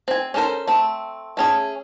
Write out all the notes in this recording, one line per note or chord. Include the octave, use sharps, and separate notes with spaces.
C4 G#5
C#4 D4 A4 A#4 C5
A3 C4
A3 C#4 G#4